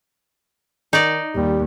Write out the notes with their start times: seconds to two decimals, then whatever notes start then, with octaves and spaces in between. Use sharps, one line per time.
0.93 D#3 D#4 D5
1.35 D#2 G3